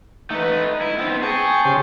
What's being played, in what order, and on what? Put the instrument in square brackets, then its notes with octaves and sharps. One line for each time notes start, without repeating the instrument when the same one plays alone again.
[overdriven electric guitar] A3 B4 [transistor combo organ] D#4
[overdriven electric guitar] E4
B3 C4
[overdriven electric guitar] G#4 [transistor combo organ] G5 A5 C#6
[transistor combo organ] C#3 G4 C5